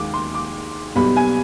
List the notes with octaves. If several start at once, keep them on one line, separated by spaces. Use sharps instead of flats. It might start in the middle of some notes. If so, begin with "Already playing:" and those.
Already playing: D#2 D#3 G#3 D6
C6
D6
B1 B2 G3 B3 B5
G#5